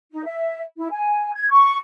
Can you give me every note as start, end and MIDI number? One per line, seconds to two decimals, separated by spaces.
0.12 0.23 63
0.25 0.61 76
0.78 0.87 64
0.91 1.32 80
1.34 1.49 92
1.50 1.77 85